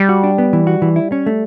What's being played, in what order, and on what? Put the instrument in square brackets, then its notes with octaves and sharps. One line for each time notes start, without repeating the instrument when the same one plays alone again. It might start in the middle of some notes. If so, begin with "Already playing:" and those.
Already playing: [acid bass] G3
[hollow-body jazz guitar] F#4
D4
B3
E3
F#4
E3
E4
C#4
A3